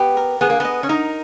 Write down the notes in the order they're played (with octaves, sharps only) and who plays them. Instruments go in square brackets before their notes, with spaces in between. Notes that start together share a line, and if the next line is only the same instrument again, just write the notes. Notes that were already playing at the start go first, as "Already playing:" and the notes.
Already playing: [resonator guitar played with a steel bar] B3 [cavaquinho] G4
[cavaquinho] A#4
[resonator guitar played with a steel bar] B3 [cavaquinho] G#4
[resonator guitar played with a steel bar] A#3
[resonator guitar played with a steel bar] B3 [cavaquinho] D#5
[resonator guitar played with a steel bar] C#4
[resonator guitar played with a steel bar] D#4 [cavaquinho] A#4